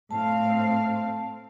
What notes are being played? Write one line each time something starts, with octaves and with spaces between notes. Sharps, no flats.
A2 C4 F5 A5